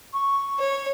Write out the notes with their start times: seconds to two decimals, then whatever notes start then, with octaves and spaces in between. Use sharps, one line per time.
0.13 C#6
0.59 C#5